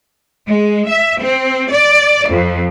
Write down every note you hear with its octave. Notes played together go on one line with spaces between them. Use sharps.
G#3
E5
C4
D5
F2